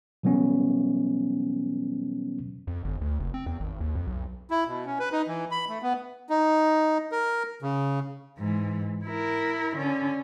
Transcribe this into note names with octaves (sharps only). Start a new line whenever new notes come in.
B2 E3 F#3 G3 B3 C#4
F2
G1
D2
F1
C4
E2
G#1
D#2
F2
B1
E4
B2
C#4
B4
D#4
E3
B5
A3
B3
D#4
A#4
C#3
G#2 E3
E4 A#4
D3 C#4